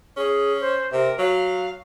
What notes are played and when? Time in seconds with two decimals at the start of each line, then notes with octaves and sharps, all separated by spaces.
0.17 C#4 G#4
0.60 C5
0.92 C3 A#4
1.19 F#3 F5